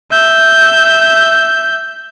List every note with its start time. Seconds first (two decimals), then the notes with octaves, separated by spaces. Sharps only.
0.11 E5 G6